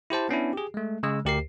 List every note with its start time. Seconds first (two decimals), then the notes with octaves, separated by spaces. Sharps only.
0.10 E4 G4 C5 A5
0.29 B3 C#4 D4 E4
0.53 G4 G#4
0.74 G#3 A3
1.03 C#3 G#3 E6
1.25 D2 G4 A#4 C7